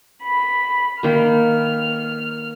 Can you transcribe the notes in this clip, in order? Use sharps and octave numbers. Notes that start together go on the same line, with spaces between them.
B5
D#3 A#3 F6